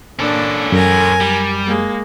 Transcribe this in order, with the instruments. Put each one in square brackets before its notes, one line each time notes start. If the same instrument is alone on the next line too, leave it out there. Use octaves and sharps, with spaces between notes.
[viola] A#3 D4 [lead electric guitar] C#4 A4
[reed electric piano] F#2 [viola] A#4 G#5
[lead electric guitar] G3
[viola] G#3 A#3